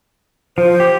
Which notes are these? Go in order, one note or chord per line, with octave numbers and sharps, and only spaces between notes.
F3 C5
G4